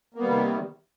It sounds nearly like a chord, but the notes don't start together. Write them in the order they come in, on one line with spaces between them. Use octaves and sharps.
A#3 B3 G3 D#3 C3